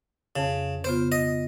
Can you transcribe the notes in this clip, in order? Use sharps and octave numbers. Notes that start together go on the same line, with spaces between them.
F2 C#3 A5
C#3 B3 F4 C5
D#5